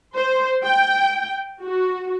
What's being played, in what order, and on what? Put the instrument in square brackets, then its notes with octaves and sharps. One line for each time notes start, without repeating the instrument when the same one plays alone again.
[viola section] C5
G5
F#4